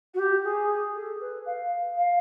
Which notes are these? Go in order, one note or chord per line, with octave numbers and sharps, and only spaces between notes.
F#4
G4
G#4
A4
B4
F5
F5